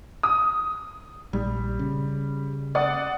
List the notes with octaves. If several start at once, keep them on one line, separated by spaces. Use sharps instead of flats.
D#6
A#1 G3
C#3
D5 F#5 D#6